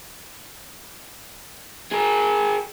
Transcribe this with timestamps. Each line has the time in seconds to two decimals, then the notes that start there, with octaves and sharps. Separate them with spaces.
1.92 G#4 A#4